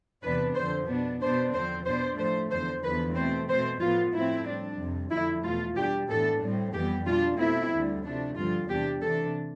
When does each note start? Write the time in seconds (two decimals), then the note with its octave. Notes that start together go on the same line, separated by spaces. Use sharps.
0.23 E2 C3 E3 B3 D4 B4
0.55 F2 D3 F3 C5
0.88 B2 B3 D4
1.21 B2 B3 D4 C5
1.54 E2 D3 F3 C4 C5
1.86 B2 B3 D4 C5
2.18 A2 F3 A3 C5
2.51 E2 D3 F3 C5
2.83 E2 D3 F3 B4
3.15 B2 A3 C4 C5
3.49 B2 A3 C4 C5
3.81 A2 F3 B3 F4
4.13 A2 F3 A3 C4 E4
4.47 A2 G3 D4
4.78 F2 C3 G3
5.11 F2 D3 F3 A3 E4
5.43 E2 B2 A3 F4
5.76 B2 G3 D4 G4
6.08 A2 E3 B3 D4 A4
6.42 A2 G3 C4
6.73 F2 E3 G3 B3 G4
7.06 B2 G3 D4 F4
7.39 B2 A3 C4 E4
7.72 D2 D3 G3
8.04 C3 F3 A3 D4
8.36 G2 D3 F3 C4 F4
8.69 E2 C3 G3 D4 G4
9.01 C3 E3 A3 D4 A4